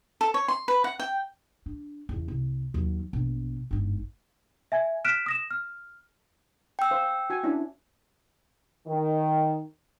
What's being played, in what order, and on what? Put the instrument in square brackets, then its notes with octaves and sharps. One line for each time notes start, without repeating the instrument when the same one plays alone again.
[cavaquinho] A4
C#5
C6
B4
F#5
G5
[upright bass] D4
E2 C#3
C2
D#2 F#3
A#1 B2
G1 G#2
[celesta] E5 G#5 G#6
F6 F#6 B6 D7 E7
D#6 A#6 E7
F6
[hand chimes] G5 E6
[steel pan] C5 F5
F#4 G#5
C#4 D4 E4
[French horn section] D#3